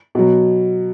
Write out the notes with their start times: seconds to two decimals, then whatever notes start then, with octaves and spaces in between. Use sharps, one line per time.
0.15 B2 F#3